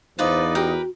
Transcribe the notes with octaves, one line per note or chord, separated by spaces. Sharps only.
E2 D#4 F4 B4 C5 D5
F#4 G4 A#4 B4